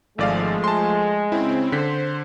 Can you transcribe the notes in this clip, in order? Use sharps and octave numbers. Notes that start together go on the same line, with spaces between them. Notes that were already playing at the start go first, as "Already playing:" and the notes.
G#1 F3 G#3 A3 D5 F5
A5 C6
C#3 C4 E4
D3 C5 B6